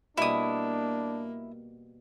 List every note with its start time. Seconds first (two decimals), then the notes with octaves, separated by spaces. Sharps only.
0.17 B2 G3 A#3 D4 E4 D#6